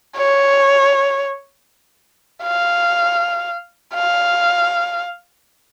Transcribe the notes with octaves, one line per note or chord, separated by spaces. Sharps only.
C#5
F5
F5